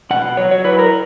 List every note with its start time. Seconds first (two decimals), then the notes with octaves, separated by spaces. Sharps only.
0.10 B2 F#5
0.37 F#3 C#5
0.51 C#5
0.64 E4 B4
0.79 A#4